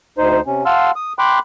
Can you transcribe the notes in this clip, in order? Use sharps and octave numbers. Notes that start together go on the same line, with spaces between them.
D2 D#4 C5
C3 C#4
F5 F#5 A5 C6 E6 F6
D#6
G5 B5 C6 D6 F#6